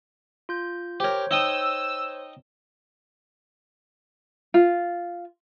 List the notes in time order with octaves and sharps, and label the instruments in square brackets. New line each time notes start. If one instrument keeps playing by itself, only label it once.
[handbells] F4 G6
[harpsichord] G4 A#4 [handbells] C5 C#5
[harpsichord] D#4 G5 D#6 [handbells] C5 C#5 [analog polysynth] E6
[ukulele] F4